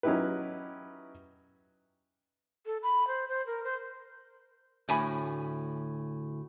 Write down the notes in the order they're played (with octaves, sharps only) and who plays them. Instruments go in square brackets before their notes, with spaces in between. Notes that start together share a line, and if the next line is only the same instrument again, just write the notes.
[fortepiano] F#3 C#4 D#4 E4 G4 B4
[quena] A4
B5
C5
C5
A#4
C5
[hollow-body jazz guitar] D2 A2 G#5 B5